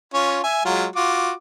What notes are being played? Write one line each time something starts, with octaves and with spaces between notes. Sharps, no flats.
C#4 F4 C#5
E5 G#5
F#3 G#3 F4
F4 F#4 D6